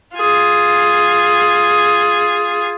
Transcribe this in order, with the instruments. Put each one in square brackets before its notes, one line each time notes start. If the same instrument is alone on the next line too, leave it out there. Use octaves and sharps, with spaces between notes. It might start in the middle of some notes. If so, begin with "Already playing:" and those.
[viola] F4 G#4